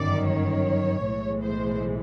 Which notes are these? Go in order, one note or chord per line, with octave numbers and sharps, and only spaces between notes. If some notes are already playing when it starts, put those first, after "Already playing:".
Already playing: G1 F#2 D#3 D5
C#5
B1 A2 E3 G#3
C5